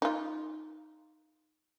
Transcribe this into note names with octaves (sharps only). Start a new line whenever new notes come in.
D#4 F4